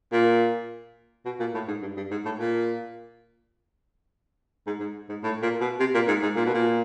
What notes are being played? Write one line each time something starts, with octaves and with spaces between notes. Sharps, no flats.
A#2
B2
A#2
A2
G#2
G2
G2
G#2
A2
A#2
G#2
G#2
G#2
A2
A#2
B2
C3
A#2
G#2
G#2
A#2
B2
A#2